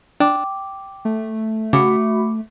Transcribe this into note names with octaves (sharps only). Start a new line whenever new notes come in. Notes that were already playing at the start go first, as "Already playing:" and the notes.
D4 G5 D6
A3
C#3 F#4 B5 D6 C#7